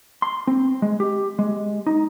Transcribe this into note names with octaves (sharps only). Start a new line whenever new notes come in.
C6
C4
G#3
G4
G#3
D#4